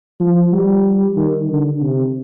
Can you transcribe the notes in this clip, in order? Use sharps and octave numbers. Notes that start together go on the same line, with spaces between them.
F3
G3
D#3
D3
C3